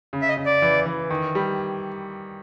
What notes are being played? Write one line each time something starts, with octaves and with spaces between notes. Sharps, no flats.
C#3
E5
D#5
C#3
D5
E3
E3
D#3
G3